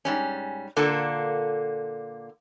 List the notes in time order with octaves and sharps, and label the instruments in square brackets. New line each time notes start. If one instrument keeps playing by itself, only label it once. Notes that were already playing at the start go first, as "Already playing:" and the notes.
[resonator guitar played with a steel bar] G#2 G3 C#4
A#2 D3 A#3 F4 A4